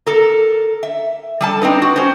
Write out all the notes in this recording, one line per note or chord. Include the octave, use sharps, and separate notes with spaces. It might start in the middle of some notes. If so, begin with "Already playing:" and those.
A4 A#4
E5
G3 A4 A5
C4 D4 D#4 B4
F#4
C#4 C5